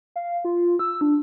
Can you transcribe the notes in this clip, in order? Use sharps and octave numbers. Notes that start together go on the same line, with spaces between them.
F5
F4
E6
D4